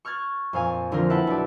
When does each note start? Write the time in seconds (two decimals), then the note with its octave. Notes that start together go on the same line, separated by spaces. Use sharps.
0.05 C#6 F6 F#6 G#6 A6
0.53 F2 A#2 F5 G#5
0.91 D3 F3 A#3 C4 F4 A#4
1.10 E4 B4 E5 F#5 G5 A5
1.27 B1 D5